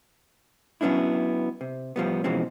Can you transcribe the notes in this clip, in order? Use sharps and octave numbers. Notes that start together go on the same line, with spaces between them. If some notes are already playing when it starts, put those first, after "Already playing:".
F#3 B3 C#4 D4 E4
C3
A2 F3 G3 B3
B2 E3 F3 G#3 C4 C#4